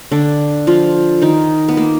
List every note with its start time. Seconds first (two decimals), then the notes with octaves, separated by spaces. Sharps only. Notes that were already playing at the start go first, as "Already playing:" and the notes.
0.11 D3 D4
0.67 F3 F4
1.22 D#3 D#4
1.69 B3
1.77 A#3